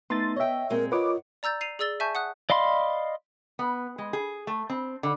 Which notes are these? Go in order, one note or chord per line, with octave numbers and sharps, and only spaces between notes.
A3 B3 D#4 C6 A6
C#5 D#5 E5 G5
A#2 G#3 C4 A#4
F4 A#4 B4 C#5 D#5 F#5 D6
D5 A#5 E6 G6 A6
C7 D#7 F7
G#4 D5 E6 A6 G7
E5 G#5 A5 C#6 G6
F#5 D#6 F#6
D5 D#5 F5 B5 C6
B3
G#3
G#4
A3
C4
D3